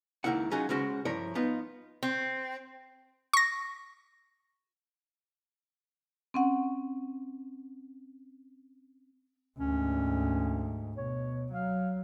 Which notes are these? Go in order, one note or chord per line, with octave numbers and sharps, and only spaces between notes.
C#2 B2 D#3 A#3 E4 F#5
F#3 C#4 D#4 F4 F#4 G#4
C#3 G#3 C#4 F#4 C5
G2 F3 E4 A#4 C#5 D5
B3 D#4 F4
C4
C#6 A#6
C4 C#4 F#5
D2 G#2 C#4
B2 C#5
F#3 F5